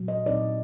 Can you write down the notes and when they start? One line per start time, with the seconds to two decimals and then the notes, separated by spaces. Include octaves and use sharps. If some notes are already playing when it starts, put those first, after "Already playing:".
Already playing: A#2 F#3
0.08 D#5
0.26 A#2 F#3 C4 D#4 D5